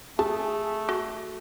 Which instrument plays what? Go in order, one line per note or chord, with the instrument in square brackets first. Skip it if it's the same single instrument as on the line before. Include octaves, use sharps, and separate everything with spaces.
[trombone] A3 [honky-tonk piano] G#4 [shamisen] A5
[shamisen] F#4